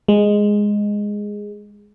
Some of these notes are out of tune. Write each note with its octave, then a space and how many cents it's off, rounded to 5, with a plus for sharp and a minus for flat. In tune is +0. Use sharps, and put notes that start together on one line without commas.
G#3 -5